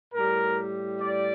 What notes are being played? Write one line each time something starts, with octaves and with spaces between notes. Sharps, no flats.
A2 G3 A#4
D5